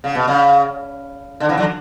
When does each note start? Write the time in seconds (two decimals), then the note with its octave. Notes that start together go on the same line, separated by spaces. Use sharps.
0.04 C#3
0.15 B2
0.28 C#3
1.40 D3
1.49 C#3 E3
1.57 D3 F#3